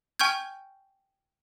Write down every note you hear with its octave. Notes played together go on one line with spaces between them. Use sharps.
G5 G#5 C#6 F6 G6 G#6